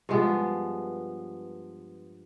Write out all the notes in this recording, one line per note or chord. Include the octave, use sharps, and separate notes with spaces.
G2 F3 G#3 B3